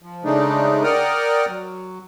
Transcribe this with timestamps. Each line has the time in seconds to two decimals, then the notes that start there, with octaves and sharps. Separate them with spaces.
0.02 F3
0.24 C#3 G#3 A3 D4 D#4
0.84 A#4 D5 F#5 G5 D#6 F6
1.48 F#3